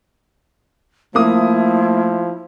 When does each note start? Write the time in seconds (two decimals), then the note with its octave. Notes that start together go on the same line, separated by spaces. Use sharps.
1.15 F3 A3 A#3 E4 D#6